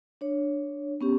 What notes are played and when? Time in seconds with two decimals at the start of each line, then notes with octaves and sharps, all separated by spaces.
0.21 D4 C#5
1.01 B3 C#4 G4